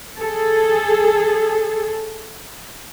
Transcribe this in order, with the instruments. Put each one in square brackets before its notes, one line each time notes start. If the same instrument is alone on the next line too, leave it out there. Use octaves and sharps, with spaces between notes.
[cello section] G#4 A4